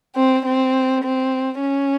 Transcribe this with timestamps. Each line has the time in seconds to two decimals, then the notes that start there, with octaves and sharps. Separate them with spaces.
0.16 C4
0.46 C4
1.04 C4
1.62 C#4